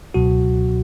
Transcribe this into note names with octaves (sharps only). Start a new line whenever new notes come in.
C#2 B2 F#3 F#4